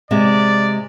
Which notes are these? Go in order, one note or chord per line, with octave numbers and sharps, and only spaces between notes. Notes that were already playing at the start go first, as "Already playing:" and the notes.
C3 G#3 D5